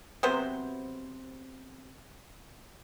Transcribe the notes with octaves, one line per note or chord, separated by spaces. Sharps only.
C3 F#3 B3 C5